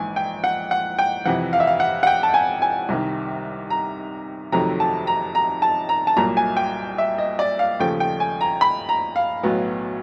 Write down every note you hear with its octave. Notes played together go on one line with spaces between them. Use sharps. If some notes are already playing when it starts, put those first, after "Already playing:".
Already playing: A#1 G#2 E3 G#5
G5
F#5
F#5
G5
F2 C3 E3 F#5
F5
E5
F5
F#5
F#5
G5
A5
G#5
G#5
C2 C3 D#3
A#5
F2 C3 D#3 F#3 A3 A#5
A5
A#5
A#5
A5
A#5
A5
C2 A#2 F#3 A#3 A#5
G#5
G5
E5
D#5
D5
F5
D#2 C#3 F3 A3 G5
G5
G#5
A#5
B5
A#5
F5
B1 A2 F#3 B3